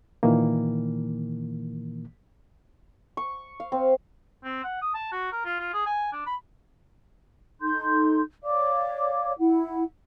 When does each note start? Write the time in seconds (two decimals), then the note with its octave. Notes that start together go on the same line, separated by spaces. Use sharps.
0.23 A#2 D#3 E3 A#3
3.17 C#6
3.60 F5
3.72 C4
4.44 C4
4.64 F#5
4.82 D#6
4.94 A5
5.12 F#4
5.32 A#4
5.45 F4
5.60 F4
5.73 G#4
5.86 G#5
6.13 D4
6.26 B5
7.61 D#4 A4 C6 G6
8.43 C#5 D5 F5 D6
9.38 E4 F#5